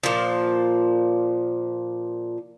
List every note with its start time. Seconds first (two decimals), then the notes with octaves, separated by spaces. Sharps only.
0.03 A#2 F3